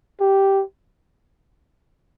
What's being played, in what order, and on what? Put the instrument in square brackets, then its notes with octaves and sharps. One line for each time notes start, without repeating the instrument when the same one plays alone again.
[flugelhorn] G4